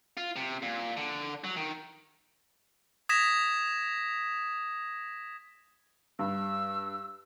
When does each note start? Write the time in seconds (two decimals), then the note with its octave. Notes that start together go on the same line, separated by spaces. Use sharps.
0.17 F4
0.36 C3
0.62 A#2
0.97 D3
1.44 F#3
1.56 D#3
3.09 D#6 G#6 A#6 B6 E7
6.19 G2 E6